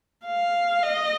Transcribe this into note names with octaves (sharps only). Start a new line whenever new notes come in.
F5
D#5